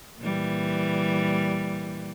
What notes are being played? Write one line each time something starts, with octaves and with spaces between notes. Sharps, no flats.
A#2 E3 G3